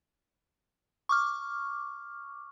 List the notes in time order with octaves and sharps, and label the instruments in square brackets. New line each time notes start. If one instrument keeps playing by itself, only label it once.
[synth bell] C#6 D6 F6